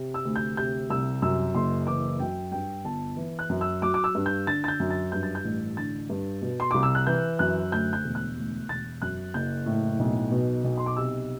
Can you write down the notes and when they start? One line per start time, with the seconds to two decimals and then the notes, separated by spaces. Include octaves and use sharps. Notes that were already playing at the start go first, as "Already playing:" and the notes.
Already playing: C3
0.14 E6
0.25 D2
0.36 G6
0.57 C3 G6
0.90 C2 E6
1.22 F#2 E6
1.55 F#1 C6
1.87 E3 D6
2.20 F#2 G5
2.52 G2 G5
2.85 G1 A5
3.17 E3
3.39 F#6
3.50 F#2
3.61 E6
3.82 F#3 D6
3.94 D6
4.04 E6
4.15 G2
4.26 G6
4.47 D3 A6
4.64 A6
4.68 G6
4.80 F#2
4.91 A6
5.12 G2 G6
5.23 A6
5.35 G6
5.45 A1
5.77 D3 A6
6.10 G2
6.42 B2
6.60 C6
6.71 C2 D6
6.83 E6
6.95 F#6
7.07 E3 G6
7.39 F#2 F#6
7.72 D2 G6
7.93 G6
8.04 E1
8.15 F#6
8.37 D2
8.69 E1 A6
9.02 F#2 F#6
9.34 F#1 G6
9.66 A2
9.99 B1
10.31 B2
10.64 B1
10.78 C6
10.86 D6
10.96 C3 E6